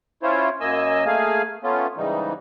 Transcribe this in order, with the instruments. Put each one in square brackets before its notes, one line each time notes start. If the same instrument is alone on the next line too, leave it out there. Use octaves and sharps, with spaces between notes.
[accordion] C#4 E4 F4 C5 C#5
F#2 A#3 D#5 G#5 E6
A3 A#3 G#4 F5 G#5
A3 B3 C#4 F4
G#2 C#3 E3 G3 D#4